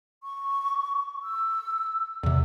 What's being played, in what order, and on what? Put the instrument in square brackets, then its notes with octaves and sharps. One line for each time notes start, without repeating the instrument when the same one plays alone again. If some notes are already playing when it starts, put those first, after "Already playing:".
[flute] C#6
E6
[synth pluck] E2 C3 [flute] E6